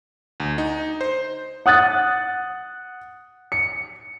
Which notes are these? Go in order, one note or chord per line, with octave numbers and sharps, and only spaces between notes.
D2
D#4
C5
F#5 D#6 F#6 A6
C#7